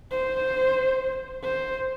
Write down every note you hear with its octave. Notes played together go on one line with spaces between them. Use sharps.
C5
C5